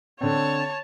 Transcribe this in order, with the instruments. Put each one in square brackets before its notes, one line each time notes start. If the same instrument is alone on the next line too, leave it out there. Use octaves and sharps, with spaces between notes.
[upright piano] D3 C4 [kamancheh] C#5 A5